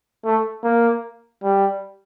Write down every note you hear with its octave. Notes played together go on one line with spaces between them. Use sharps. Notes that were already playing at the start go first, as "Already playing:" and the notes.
A3
A#3
G3